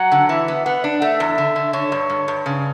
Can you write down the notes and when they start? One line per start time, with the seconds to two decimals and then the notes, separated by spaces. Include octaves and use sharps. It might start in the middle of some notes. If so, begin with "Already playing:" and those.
Already playing: F#3 F#5
0.12 D3
0.29 E3 E5
0.48 B3
0.66 B3 F#5
0.84 D4
1.02 A3 E5
1.20 E2
1.38 D3
1.56 D3
1.73 D3 C#5
1.92 G2
2.10 G2
2.28 G2
2.46 C#3